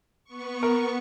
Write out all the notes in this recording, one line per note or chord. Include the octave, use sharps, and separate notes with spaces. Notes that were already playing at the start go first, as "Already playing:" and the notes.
B3 C#6
A#4